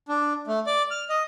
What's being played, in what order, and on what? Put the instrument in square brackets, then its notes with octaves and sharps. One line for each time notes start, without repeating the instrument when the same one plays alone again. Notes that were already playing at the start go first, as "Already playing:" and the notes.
[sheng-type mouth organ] D4
A3
D5
F6
D#5